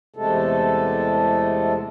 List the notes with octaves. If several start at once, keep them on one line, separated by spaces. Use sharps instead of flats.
E2 C3 G#3 A3 A4